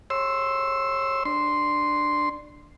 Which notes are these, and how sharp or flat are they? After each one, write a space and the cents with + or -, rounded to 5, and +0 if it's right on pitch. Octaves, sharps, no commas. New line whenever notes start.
C#5 -30 C6 +0 E6 +0
D4 +10 C6 -5